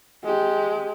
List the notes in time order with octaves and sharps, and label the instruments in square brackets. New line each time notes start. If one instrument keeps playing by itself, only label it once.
[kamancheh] G#3 [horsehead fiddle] G4